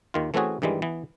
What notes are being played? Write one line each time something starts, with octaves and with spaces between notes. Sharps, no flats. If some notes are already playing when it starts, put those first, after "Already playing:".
D#2 D#3 F4
E3 A3 C4 C#4 F#4 G#4
G2 D#3 E3 G3 G#3
E3 B3